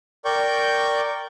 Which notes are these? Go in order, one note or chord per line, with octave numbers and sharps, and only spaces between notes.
A#4 D5 G5 C#6 G6